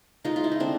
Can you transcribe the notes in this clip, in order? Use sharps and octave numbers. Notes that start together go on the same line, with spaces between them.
G#3 D#4 F4
F4
E4
D#4
D3 C4 D4